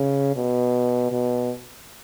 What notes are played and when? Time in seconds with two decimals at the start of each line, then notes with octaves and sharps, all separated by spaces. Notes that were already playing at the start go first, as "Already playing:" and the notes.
Already playing: C#3
0.36 B2
1.11 B2